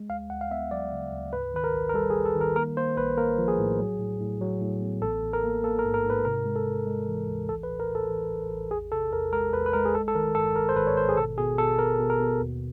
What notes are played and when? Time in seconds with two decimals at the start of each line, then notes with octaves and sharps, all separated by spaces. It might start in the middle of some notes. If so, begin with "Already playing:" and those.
Already playing: G#3
0.09 D2 F5
0.30 D2 F#5
0.41 F5
0.51 B3 E5
0.71 F#3 D5
0.92 C#3
1.12 D2
1.33 G#2 B4
1.54 D#3 B4
1.64 A#4
1.75 A1
1.89 A#4
1.94 G3 A4
2.10 G#4
2.15 G3
2.25 A4
2.36 D#3
2.41 A#4
2.56 A#3 A#4
2.77 A#3 C5
2.97 A#1 B4
3.18 A#3 A#4
3.38 F3
3.48 G#4
3.59 A2
3.80 F#3
4.00 A2
4.20 A2
4.41 F#3
4.61 A2
4.82 B3
5.02 A1 A4
5.22 A1
5.33 A#4
5.44 A#3
5.64 A#3 A4
5.79 A#4
5.85 G#2
5.94 A#4
6.05 G#2
6.10 B4
6.25 C3 A#4
6.46 G#3
6.56 A4
6.66 C3
6.86 G#3
7.08 E3
7.28 D2
7.49 A1 A4
7.63 B4
7.69 A2
7.80 A#4
7.89 A2
7.95 A4
8.09 E3
8.30 A1
8.51 A1
8.71 E2 G#4
8.92 C3 A4
9.12 E2 A#4
9.33 G#3 A#4
9.53 E2 B4
9.66 B4
9.73 G#3 A#4
9.85 G#4
9.94 G#1 A4
10.08 A4
10.15 D#3 A#4
10.35 G2 A4
10.56 G#1 A#4
10.69 C5
10.76 G#1 B4
10.87 C#5
10.96 G#1 C5
11.09 G#4
11.17 B2 A4
11.38 B2 G#4
11.58 B2 A4
11.78 B3 A#4
12.00 B2
12.10 A#4
12.20 B2
12.41 D#2